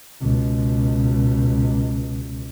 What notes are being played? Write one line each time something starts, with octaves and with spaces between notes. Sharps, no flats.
C#2 B2